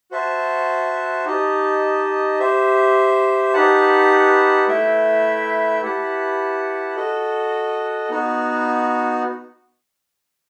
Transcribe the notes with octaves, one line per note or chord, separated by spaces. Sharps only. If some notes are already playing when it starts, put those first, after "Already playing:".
F#4 C5 E5 A5
D#4 G4 D#5 A5
G4 C5 E5
D#4 G4 B4 F#5 A5
A3 E4 B4 E5 G5
E4 G4 B4 F#5 A5
F#4 A4 D#5
B3 D#4 F#4